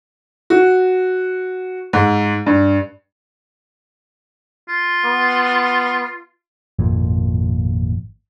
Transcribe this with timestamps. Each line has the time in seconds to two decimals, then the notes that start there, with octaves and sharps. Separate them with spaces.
0.50 F#4
1.93 G#2
2.46 G2
4.68 F4
5.05 B3
6.79 G#1 F2 A#2